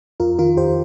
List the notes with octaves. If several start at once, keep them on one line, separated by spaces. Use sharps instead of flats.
F2 F4 A#4
D#3 F4 A#4
F2 G4 C5